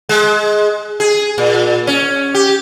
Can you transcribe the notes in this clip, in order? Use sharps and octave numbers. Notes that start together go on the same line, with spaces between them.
G#3
G#4
A#2
C#4
G4